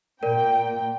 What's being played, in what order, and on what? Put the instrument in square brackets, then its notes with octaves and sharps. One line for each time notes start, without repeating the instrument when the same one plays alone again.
[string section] A#2 G5 [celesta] A#4 D5